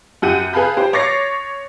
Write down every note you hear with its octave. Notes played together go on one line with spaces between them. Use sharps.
F#2 G4 F#5 G6 D#7
G#4 B4 F5 A5 B5 G6
G4 C5
C#5 D6 A6 A#6 C7